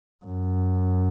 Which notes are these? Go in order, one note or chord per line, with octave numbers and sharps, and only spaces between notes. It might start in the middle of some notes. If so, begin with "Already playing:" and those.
F#2